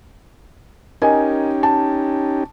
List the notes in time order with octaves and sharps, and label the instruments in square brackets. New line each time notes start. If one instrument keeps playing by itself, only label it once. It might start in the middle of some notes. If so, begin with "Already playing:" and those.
[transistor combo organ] C#4 D#4 G4 [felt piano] A#4 D#5 G#5
[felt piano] A5